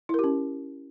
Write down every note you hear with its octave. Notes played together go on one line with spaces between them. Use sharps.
C#4 E4 G4 A#4